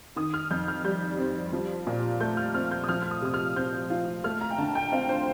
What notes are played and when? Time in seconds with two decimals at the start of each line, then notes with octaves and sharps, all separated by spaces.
0.16 D#3 D#6
0.34 F6
0.51 F2 G6
0.68 F6
0.84 G3 G6
1.18 C4
1.53 F3
1.87 A#2
2.20 A3 G6
2.37 F6
2.54 C4 F6
2.71 G6
2.84 D#6
2.89 F3 F6
3.02 F6
3.11 D#6
3.22 C3 D#6
3.34 F6
3.56 C4 G6
3.90 F4
4.24 A3 F6
4.41 A#5
4.51 G5
4.58 D3 A5
4.75 G5
4.92 C4 F5
5.09 C5